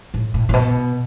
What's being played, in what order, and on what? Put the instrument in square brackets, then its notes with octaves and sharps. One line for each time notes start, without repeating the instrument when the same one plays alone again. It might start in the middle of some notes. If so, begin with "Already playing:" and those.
[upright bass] A2
A2
A2
B2